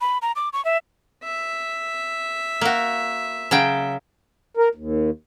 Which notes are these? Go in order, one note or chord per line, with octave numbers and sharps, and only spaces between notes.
B5
A#5
D6
C#6
E5
E5
A#3 F#4
C#3 F#3 G5
A#4
D#2